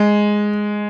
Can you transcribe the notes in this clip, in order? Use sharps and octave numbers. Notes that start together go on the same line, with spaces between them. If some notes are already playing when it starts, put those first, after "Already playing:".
Already playing: G#3